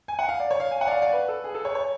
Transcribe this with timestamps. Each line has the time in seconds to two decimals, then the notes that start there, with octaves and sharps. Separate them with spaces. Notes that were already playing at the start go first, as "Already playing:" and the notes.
0.08 G#5
0.19 F#5
0.29 F5
0.40 D5
0.51 C#5
0.60 F5
0.71 G#5
0.81 F#5
0.87 D5
0.91 F5
1.02 D5
1.13 B4
1.28 A4
1.44 G#4
1.54 A4
1.65 C#5
1.75 C#5